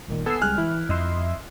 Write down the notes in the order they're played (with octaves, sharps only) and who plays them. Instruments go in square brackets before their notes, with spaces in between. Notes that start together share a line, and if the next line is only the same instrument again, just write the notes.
[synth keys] G1 A#2 D#3
[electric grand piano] B3 A4 [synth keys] G#5 E6 C7
[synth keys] C#2 G3 G#3 [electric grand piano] G#5 F6 F#6
[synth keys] E3 [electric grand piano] E4
[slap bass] F2 [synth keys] D#5 E5 C6